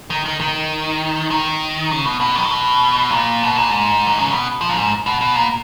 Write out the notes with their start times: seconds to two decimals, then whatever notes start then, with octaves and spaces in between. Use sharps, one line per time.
0.10 D#3
0.26 D#3
0.41 D#3
1.31 D#3
1.91 C#3
2.05 B2
2.21 B2
2.35 D#3
2.45 C#3
2.51 B2
3.11 A#2
3.43 B2
3.56 A#2
3.70 G#2
4.07 D#3
4.18 C#3
4.31 B2
4.61 F3
4.69 A#2
4.76 G#2
5.06 B2
5.21 B2
5.35 A#2